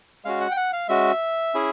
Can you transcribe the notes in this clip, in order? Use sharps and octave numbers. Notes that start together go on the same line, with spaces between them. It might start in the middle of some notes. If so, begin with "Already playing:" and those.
G#3 C#4 F#4 F5
F#5
G5
F#5
F5
G#3 C#4 F#4 E5
C#4 E4 G#4